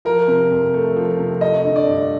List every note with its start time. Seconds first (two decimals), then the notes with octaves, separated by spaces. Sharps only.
0.05 F3 A#4
0.28 C3
0.51 F2
0.74 A3
0.96 F3
1.19 C3
1.41 A3 D#5
1.65 D3
1.76 D5
1.87 G2